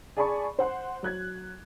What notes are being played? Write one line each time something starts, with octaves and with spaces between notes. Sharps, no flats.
G#4 D5 G#5 A5 B5 C#6
C5 F#5 C6
F#3 F#6 G#6